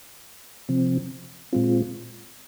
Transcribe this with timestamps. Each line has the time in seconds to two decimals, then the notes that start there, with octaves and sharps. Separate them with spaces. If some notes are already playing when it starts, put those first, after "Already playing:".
0.69 C3 F3 C4
1.53 A#2 G#3 C4 F4